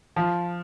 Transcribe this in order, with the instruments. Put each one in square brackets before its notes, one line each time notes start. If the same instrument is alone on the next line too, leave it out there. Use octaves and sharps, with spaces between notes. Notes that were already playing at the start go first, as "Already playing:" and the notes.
[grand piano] F3